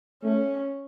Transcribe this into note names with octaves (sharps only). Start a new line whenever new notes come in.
A3 C#4